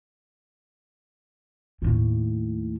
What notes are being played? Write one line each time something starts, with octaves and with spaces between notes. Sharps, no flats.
D#2 A2